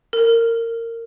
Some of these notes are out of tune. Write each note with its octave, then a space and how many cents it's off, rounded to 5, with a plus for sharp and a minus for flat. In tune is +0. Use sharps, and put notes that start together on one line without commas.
A#4 -20